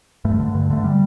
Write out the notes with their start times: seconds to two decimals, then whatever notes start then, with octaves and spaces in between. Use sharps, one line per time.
0.25 G2 A3
0.40 D3
0.55 G2
0.70 D3 A3
0.84 G3